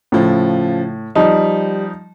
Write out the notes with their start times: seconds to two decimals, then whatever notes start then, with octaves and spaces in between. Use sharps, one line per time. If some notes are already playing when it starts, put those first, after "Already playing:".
0.12 A2 C#3 F3
1.15 F3 G3 D#4